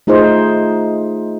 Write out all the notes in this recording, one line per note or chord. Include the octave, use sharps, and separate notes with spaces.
A3 D#4 F4 G#4 C5